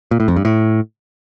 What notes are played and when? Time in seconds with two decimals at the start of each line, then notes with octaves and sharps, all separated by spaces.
0.11 A#2
0.20 A2
0.28 F2
0.36 G2
0.45 A2